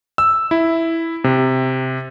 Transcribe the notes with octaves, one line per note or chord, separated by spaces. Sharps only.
E6
E4
C3